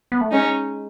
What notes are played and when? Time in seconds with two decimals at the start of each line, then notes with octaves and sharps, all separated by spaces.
0.12 B3
0.21 A3
0.31 G#3 C#4 D#4